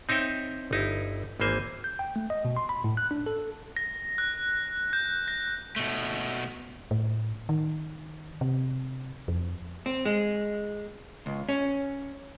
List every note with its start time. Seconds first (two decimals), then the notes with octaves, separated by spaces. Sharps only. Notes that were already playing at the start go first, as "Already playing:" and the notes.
0.09 C4 D#4 C#5 E5 G5
0.71 G1 D#4 E4
1.40 G#1 E3 A#3 C5 G#5
1.84 G6
1.99 G5
2.16 A3
2.30 D#5
2.45 B2
2.57 C6
2.69 B5
2.84 A2
2.97 F#6
3.11 D4
3.26 A4
3.77 A#6
4.18 F#6
4.93 G6
5.28 A#6
5.76 B2 A3
6.91 A2
7.49 D#3
8.41 C3
9.28 F2
9.86 C4
10.05 G#3
11.26 C#2
11.49 C#4